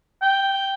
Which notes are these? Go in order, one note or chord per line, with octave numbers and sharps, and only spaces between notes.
G5